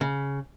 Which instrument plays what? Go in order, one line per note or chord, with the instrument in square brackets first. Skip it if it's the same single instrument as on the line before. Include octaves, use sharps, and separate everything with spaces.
[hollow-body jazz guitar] C#3